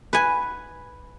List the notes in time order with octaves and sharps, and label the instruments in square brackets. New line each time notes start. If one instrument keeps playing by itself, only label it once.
[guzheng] B4 F#5 G#5